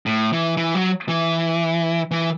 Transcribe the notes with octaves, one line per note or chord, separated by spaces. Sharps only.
A2
E3
E3
F#3
E3
E3